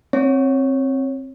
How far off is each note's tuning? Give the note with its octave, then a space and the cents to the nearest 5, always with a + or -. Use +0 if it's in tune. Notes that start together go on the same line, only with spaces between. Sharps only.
C4 +20 C#5 -5